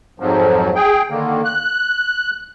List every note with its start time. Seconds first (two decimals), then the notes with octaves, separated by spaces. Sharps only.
0.20 F2 G#2 F3 F#3
0.75 G#4 G5
1.10 D3 D#3 A#3
1.45 F#6